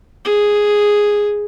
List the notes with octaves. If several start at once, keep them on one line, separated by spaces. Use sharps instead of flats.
G#4